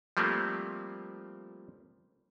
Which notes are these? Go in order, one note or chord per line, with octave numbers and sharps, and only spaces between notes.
F3 G3 A3 A#3 C4